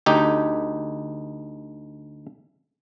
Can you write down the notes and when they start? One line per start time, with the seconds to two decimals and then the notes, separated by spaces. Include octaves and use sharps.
0.06 D2 D#4 G4